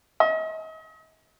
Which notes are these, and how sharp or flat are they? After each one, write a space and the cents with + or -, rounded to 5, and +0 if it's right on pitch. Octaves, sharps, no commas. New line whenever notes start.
D#5 +40